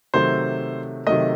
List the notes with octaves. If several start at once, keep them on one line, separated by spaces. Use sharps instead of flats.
C3 D#3 F#3 A3 C5
C3 D#3 F#3 A3 D#5